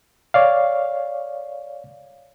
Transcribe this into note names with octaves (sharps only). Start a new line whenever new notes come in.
C#5 D5 F5